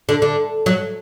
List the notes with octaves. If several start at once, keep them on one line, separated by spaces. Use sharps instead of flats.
D3
D3
F#3